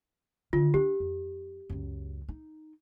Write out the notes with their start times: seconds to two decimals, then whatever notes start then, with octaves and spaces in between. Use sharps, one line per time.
0.53 D3 D#3 F4
0.74 D4 G4
1.00 F2
1.70 C#2 F#2
2.29 D#4